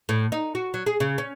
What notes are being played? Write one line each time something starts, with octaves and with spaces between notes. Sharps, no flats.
A2
D#4
F#4
F#3
G#4
C#3
C#4